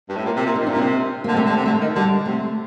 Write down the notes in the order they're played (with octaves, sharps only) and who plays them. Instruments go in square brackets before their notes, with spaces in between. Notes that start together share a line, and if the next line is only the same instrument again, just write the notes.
[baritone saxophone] G2
A2
A#2
C3
A#2
[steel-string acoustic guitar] D#4
[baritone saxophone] C3
[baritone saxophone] A#2 [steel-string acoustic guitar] D4
[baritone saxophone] C3 [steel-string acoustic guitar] C4
[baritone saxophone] D3 [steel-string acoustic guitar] A#3
[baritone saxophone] C3 [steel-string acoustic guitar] A3
[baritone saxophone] D3
C3
[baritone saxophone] D3 [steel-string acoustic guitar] A3
[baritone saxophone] D#3
[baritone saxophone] D3 [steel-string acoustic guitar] G3
[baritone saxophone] C3 [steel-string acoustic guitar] A3